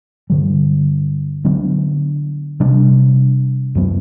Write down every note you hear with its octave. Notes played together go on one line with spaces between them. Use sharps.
G2 D3 G3
D3 F#3 B3 D4
C3 G3 D4
F#2 F#3 B3